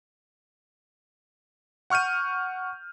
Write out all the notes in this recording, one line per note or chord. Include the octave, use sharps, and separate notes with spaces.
F#5 C#6 F6 G6 D#7